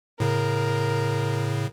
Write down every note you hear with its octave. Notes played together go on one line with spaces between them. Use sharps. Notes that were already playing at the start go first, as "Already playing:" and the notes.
A2 C#3 A#4